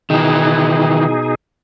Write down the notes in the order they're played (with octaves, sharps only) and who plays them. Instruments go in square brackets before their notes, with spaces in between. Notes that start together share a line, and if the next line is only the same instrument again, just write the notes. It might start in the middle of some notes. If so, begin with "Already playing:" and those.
[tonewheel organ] B2 D#4 G#4 [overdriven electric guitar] D#3 E3